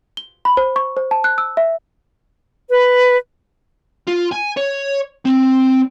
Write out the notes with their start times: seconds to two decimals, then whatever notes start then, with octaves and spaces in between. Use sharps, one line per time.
0.17 G7
0.45 B5
0.57 C5
0.76 C#6
0.97 C5
1.11 A5
1.24 F#6
1.38 E6
1.57 E5
2.70 B4
4.07 F4
4.32 G#5
4.57 C#5
5.25 C4